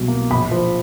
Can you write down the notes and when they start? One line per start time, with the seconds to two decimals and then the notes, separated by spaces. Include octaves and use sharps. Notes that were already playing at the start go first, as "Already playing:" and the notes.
Already playing: C2 B2 F#3
0.08 A#3
0.31 A#1 B5
0.51 F3